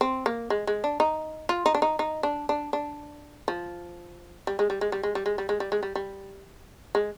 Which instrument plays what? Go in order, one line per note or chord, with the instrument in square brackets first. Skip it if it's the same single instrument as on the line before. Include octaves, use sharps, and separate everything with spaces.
[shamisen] C4
A#3
G#3
G#3
D4
D#4
F4
D#4
D4
D#4
D#4
D4
D4
D4
F3
G3
G#3
G3
G#3
G3
G#3
G3
G#3
G3
G#3
G3
G#3
G3
G3
G#3